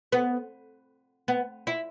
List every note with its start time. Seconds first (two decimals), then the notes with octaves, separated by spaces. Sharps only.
0.12 B3
1.28 B3
1.67 E4